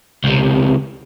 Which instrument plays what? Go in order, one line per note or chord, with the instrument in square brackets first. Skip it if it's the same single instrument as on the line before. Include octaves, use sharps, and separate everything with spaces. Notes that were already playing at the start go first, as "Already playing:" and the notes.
[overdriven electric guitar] C#2 C3